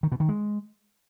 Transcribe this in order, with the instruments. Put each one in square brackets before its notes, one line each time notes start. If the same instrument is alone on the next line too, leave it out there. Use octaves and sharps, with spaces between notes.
[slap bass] D#3
B2
D#3
G#3